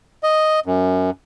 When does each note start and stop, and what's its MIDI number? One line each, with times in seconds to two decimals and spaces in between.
0.23 0.60 75
0.66 1.10 42